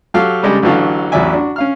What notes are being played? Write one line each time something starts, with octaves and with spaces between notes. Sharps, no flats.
F#3 G4 A4 F5
C#3 G3 G#3 G4 A4
A1 D3 E3 F#3 A4 F5
A1 E2 F#3 D5 E5 G#5
D4 F#4
C#4 F5 F6